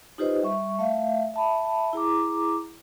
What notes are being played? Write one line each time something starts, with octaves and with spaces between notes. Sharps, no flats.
D#4 F4 G4 B4 C5 D#5
G3 E5 C#6
A3 E5 F5
E5 A5 B5
E4 G#4 A#5 D6